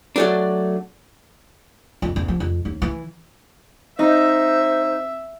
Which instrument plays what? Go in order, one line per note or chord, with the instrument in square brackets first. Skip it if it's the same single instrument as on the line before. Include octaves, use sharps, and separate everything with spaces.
[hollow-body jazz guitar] F#3 A3 D4
[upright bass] F2
E2
F3
F2
D#2
E3
[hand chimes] C4 [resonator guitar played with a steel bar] D#4 [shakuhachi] C5 [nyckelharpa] E5